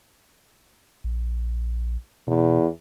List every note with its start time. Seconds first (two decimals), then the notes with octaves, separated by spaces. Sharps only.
1.04 A#1
2.27 E2 B2